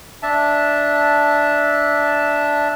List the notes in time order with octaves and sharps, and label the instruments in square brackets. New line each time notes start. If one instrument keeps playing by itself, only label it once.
[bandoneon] D4 E5 A5